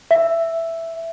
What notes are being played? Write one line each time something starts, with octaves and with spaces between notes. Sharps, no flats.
E5